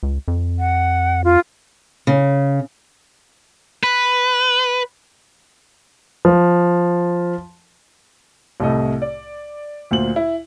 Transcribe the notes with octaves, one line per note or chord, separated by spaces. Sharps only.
C#2
F2
F#5
F4
C#3
B4
F3
C2 A2 C3 A3 D#5
D5
D2 A#2 C5 F#7
E4